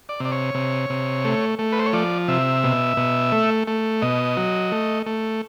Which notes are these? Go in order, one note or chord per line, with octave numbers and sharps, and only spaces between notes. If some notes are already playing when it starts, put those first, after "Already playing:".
D5
C3 D5
C#5
C3
C3
A3
A3
B4
C5
C#5
F3 D5
C3 E5
B2
B2
A3
A3
B2 D#5
F#3
A3
A3